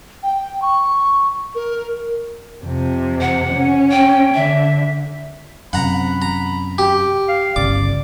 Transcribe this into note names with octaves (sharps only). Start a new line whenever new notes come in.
G5
C#6
A#4
F2 C3
F#5
C#4
G5
D3 E5
F#2 C3 F#5 A#5 B5
A#5
G4
F5
G1 C2 C#3 D5 D6